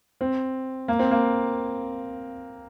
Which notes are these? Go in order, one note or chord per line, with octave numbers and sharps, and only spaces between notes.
C4
A#3
C4
A#3